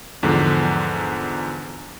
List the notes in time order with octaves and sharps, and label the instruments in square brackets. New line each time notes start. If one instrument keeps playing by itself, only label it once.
[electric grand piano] E2 G#2 D3 F3